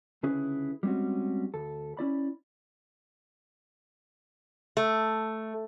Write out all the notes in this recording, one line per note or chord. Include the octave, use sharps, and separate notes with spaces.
C#2 D3 C#4 E4 G#4 B4
G3 G#3 C4 C#4 F#4
D2 A4
C#4 E4 D5 B5
A3